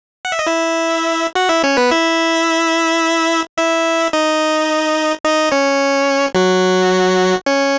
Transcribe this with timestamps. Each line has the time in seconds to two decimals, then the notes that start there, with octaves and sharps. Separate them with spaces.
0.25 F#5
0.32 E5
0.39 D#5
0.47 E4 E5
1.35 F#4 F#5
1.49 E4 E5
1.63 C#4 C#5
1.77 B3 B4
1.91 E4 E5
3.57 E4 E5
4.13 D#4 D#5
5.24 D#4 D#5
5.52 C#4 C#5
6.35 F#3 F#4
7.46 C#4 C#5